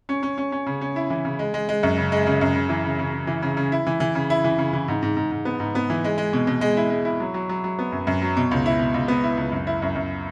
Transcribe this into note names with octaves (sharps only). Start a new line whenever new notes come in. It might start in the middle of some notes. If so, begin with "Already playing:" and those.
C#4
C#4
C#4
C#4
C#3
C#4
E4
E3
C#3
G#3
G#3
G#3
F#2
C#3
G#3
C#3
F#2
C#3
E3
C#3
C#3
C#3
E3
C#3
C#3
E4
E3
E3
C#3
E4
E3
C#3
E3
G#2
G#2
G#2
G#2
B3
G#2
B3
E3
G#3
G#3
B2
B2
G#3
E4
G#3
E4
F#3
F#3
F#3
F#3
B3
F#2
F#2
F#3
B2
C#2
E4
B2
C#2
B3
E4
C#2
F#2
E4
F#2
F#2